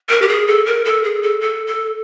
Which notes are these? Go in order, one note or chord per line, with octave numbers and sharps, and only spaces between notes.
A#4
G4
G#4
A4
A#4
A4
G#4
A4
A4
A4